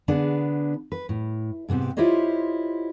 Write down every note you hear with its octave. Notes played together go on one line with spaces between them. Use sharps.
D3 B3 D4 G#4 B4
B4
A2
G#2 C3 B3 C4 G4
E4 F4 G4 C5 C#5 D#5